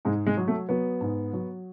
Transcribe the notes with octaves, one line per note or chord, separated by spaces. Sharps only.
G#2 G#3
G#3
F#3
A3
F#3 B3
G#2
F#3